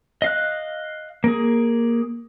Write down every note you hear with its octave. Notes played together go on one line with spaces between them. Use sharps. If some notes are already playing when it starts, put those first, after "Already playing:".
D#5 F5 F#6
A#3 G#4